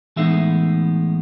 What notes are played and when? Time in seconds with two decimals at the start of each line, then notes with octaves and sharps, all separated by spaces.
0.16 A2 E3 G#3 B3 D#4 E5